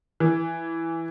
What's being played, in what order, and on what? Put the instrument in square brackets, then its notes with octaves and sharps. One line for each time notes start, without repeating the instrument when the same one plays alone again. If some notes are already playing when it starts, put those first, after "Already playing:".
[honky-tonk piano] E3